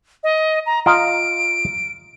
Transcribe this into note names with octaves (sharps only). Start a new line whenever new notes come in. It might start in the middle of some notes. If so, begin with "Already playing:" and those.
D#5
A#5
F4 D#5 A#5 D7